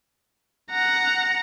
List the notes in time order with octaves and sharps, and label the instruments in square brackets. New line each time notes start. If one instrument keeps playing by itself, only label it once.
[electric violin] F#5 A#5